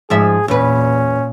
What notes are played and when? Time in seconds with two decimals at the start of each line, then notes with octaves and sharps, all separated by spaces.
0.10 G#2 F3 G#4 E5
0.48 E2 A#2 C#4 B4